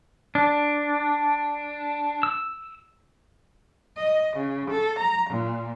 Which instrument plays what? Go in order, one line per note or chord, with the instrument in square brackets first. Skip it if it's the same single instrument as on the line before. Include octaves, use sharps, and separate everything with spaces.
[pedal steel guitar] D4
E6
[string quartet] D#5
C#3
A4
A#5
A#2